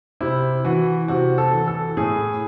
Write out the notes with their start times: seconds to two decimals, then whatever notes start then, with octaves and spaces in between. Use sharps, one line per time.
0.21 C3 E4
0.64 E3 F#4
1.08 C3 F#4
1.38 A4
1.52 E3
1.68 A4
1.97 A2 G#4